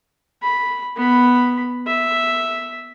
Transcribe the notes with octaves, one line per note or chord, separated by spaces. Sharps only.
B5
B3 B5
E5